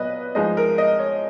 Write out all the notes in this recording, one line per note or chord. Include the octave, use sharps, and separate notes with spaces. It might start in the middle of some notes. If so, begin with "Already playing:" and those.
Already playing: A#2 F#3 B3 B4 D#5
F3 G#3 D#4 D#5
A#4
D#5
C#5